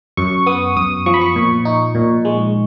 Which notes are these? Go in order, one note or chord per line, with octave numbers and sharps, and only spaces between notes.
F#2 C#6
B3 D#6
F#2 D#6
F3 C#6
B5
C#6
A#2
D#4
A#2
G#3